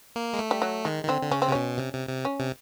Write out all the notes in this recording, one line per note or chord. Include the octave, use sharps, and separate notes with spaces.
A#3
G#3
A3
G3
F#3
D#3 G#3
D#3
D3 C4
D3
C#3 C#4
C4
C3
B2 C#4
C3
C3
C3
C#4
C3